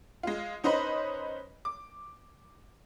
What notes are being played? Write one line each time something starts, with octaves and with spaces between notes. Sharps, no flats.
G#3 F4
C#4 D#4 B4 C5 D#5 B5
D6